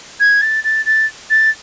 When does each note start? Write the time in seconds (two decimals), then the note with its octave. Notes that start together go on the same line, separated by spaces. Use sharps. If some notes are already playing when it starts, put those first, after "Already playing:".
0.20 G#6
0.41 A6
0.64 A6
0.85 A6
1.30 A6